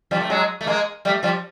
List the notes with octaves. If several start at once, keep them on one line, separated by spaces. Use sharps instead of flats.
F3 G3
A3
F#3 G#3
A3
G#3 A#3
G3 A3
F3 G3